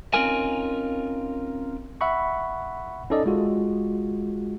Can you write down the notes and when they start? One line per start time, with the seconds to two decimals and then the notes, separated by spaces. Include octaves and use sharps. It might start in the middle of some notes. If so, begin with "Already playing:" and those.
0.14 C4 C#4 D#4 F4 A#4 G#5
2.01 E5 F#5 B5 C#6
3.10 C#4 D#4 A4 D5 D#5
3.26 G#3 F4 F#4